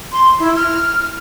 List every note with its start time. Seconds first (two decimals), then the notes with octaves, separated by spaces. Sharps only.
0.12 C6
0.39 E4
0.56 F6